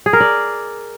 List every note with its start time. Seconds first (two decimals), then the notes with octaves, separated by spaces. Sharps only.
0.06 G#4
0.13 A#4
0.20 D5